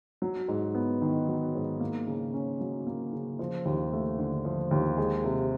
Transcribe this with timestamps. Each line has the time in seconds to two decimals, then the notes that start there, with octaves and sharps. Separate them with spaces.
0.22 F#3
0.48 G#2
0.75 B3
1.02 D#3
1.28 F#3
1.55 G#2
1.80 A#3
2.07 C#3
2.34 C#4
2.61 F#3
2.87 A#3
3.13 C#3
3.39 F3
3.65 D#2
3.93 A3
4.19 D3
4.45 F3
4.71 D#2
4.97 G#3
5.24 C3